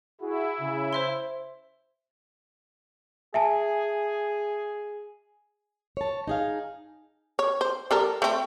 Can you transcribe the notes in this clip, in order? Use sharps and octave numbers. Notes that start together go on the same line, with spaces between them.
E4 F#4 G#4
C#3
C5 E5 C6
G#4 E5 G#5 A5
C#5 A5
D#4 G#4 F5
C#5
C5
G3 A4 A#4
A3 C4